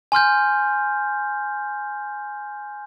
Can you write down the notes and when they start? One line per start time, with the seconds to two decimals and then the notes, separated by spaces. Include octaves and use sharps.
0.12 G#5 C6 F6 G6